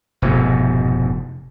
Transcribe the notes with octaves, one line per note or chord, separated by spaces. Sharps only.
F1 G#2 B2